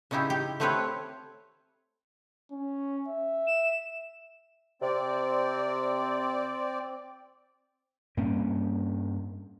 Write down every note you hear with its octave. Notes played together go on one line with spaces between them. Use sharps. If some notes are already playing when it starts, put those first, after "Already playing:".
C#3 C#4 D#4 E4 G4
G4
A3 C4 G4 B4 C#5 F5
C#4
E5
E7
C3 C4 D5
G2 A#3 C4 C#4